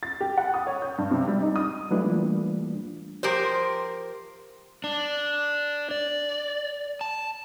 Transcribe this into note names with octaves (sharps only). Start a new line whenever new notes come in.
A6
G4
F#5
D#6
C#5
G6
G2
C3
G3
D#4
D#6
F#3 G#3 A3 D4 E4 B4
E3 G3 A3 A#3 D4 F4
F3 G4 A#4 C5
D4
D5
A5